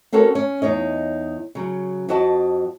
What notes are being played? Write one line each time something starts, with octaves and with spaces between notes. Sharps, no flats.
C4 C#4 F#4 A4 A#4 C#5
C#4
E2 D#4 C#5 D#5
C#3 F#3
F2 C4 F#4 D#5 A5